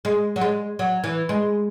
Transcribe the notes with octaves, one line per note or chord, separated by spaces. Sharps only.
G#3
F#3
G#3
F#3
E3
G#3